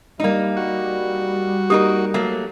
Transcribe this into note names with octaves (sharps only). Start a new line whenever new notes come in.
G3 A#3 D#4
F#4
A#3 D#4 G4 A#4 D#6
F#3 A3 A#3